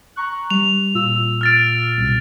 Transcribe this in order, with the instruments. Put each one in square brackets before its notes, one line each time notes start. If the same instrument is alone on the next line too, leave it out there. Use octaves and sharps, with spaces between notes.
[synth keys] A#5 C#6 F#6
[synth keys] G3 [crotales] F7
[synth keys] A#2 F4 E6
[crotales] F6 A6 D7
[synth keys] C2 B2